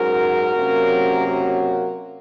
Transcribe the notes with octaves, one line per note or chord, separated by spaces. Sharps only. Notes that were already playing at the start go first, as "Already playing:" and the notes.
Already playing: G#2 F#3 C#4 F#4 A#4
C3 F#3 A#3 C#4
F#4 A#4